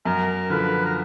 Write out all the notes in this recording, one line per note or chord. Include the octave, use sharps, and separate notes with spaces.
F#2 A#4
D3 F3 B4
A#4